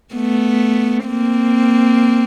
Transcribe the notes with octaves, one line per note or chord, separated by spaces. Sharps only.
A3 B3
A#3 C4